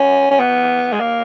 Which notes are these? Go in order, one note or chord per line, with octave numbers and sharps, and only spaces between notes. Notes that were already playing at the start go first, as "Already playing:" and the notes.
Already playing: C#4
C#4
B3
G#3
A#3